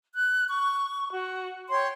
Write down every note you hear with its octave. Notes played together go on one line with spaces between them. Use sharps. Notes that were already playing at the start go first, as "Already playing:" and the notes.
F#6
C#6
F#4
C#5 G5 C6